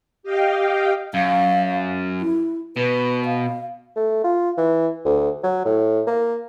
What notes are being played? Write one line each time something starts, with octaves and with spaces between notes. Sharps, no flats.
G4 D#5 F5 G5
F#2 F5
E4
B2 B4
F5
A3
F4
E3
D2
F#3
A2
A#3